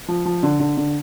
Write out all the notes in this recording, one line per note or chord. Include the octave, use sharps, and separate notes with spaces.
F3
F3
D3
D3
D3